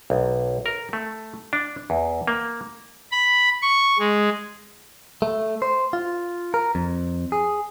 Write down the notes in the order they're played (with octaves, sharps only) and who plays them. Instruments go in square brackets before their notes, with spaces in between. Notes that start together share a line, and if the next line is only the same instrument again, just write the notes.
[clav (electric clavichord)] B1
A#4
A3
D4
E2
A#3
[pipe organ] B5
C#6
G#3
[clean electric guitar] A3
C5
F4
A#4
F2
G#4